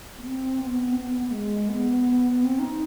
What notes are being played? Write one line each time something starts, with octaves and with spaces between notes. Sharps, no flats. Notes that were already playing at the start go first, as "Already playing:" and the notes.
B3
C4
B3
C4
B3
B3
G#3
B3
C4
D#4